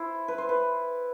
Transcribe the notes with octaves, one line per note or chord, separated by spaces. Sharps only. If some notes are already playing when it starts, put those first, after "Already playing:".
Already playing: E4 C5
B4
C5
B4